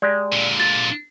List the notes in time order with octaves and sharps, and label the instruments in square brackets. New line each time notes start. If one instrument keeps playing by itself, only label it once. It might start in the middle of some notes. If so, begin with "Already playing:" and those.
[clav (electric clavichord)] G#3 G4 A#5 [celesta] D5
[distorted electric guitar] A#2 D3
[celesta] A6